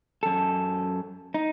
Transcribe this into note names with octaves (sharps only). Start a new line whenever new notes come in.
F#2 A4
D#4